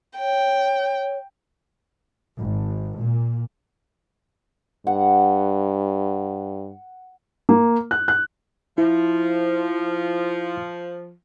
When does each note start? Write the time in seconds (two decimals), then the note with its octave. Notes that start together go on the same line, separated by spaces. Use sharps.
0.19 C#5 G5
2.37 G#1
3.00 A#2
4.87 G2 F#5
7.49 A#3
7.91 F#6
8.08 F#6
8.78 F3 E4